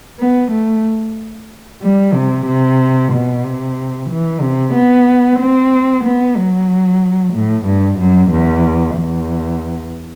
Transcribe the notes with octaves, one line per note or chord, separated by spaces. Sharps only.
B3
A3
G3
C3
C3
B2
C3
E3
C3
B3
C4
B3
F#3
A2
G2
F#2
E2
E2